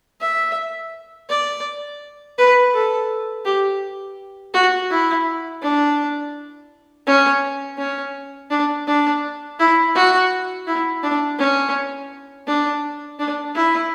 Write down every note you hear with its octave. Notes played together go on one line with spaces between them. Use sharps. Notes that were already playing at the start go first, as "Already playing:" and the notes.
E5
D5
B4
A4
G4
F#4
E4
D4
C#4
C#4
D4
D4
E4
F#4
E4
D4
C#4
D4
D4
E4